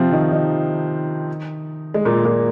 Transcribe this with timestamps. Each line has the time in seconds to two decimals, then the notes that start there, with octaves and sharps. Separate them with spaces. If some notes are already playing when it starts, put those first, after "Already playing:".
Already playing: C3 F3 C4 F4
0.12 D#3 D#4
0.32 D#3 D#4
1.94 G#3
2.05 A#2 A#3
2.24 A#2 A#3